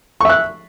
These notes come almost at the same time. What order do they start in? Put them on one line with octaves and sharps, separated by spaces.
C#6 E5 F#6